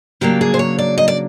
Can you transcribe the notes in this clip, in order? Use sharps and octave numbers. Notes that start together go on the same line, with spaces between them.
C#3 F#3 A#3 D4 G4
G#4
C5
C#5
D5
D#5
D5